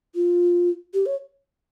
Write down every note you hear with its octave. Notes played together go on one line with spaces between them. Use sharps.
F4
G4
C#5